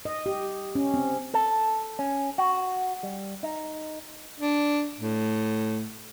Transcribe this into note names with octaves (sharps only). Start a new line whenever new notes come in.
D#5
G4
C#4
C4
A4
C#4
F#4
G3
D#4
D4
A2